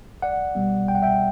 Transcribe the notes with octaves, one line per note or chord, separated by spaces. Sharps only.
C2 D5 F#5
B2 G3 B3
C2 G5
F#5
E5 G5